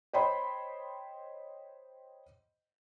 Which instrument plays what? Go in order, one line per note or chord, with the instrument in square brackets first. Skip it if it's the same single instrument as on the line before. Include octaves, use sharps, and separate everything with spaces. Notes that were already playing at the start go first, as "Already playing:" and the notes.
[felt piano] C5 C#5 D#5 G5 B5 C6